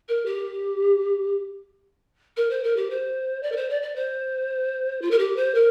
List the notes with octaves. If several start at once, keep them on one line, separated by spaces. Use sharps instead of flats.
A#4
G4
A#4
C5
A#4
G4
C5
D5
A#4
C5
D5
D5
C5
F4
A#4
G4
C5
A#4